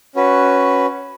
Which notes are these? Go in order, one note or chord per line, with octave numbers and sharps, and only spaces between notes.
C#4 F#4 B4